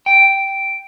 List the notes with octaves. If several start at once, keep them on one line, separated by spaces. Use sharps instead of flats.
G5